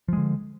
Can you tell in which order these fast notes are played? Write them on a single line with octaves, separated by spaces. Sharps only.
F3 G#3 D3